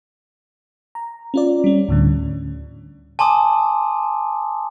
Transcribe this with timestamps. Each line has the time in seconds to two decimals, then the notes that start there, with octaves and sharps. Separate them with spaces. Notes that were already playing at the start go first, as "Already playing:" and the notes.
0.95 A#5
1.34 C#4 F4 D5
1.64 G3 C#4
1.88 D2 A2 D3
3.19 G#5 A5 C6 D6 D#6